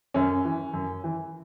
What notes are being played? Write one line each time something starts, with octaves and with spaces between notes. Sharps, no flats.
F#2 C#4
E3
F#2
E3